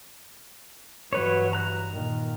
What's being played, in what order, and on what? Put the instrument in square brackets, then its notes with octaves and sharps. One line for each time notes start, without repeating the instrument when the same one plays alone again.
[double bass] G2 E3 [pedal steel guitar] F#3 B4 C#5
[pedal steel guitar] A#5 F#6
[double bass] A#2 D#3